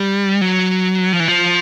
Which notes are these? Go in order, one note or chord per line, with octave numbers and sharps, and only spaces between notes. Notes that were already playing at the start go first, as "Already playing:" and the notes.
Already playing: G3
F#3
F3
E3
F3